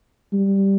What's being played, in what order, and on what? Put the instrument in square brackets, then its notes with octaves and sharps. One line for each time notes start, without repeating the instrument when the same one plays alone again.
[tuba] G3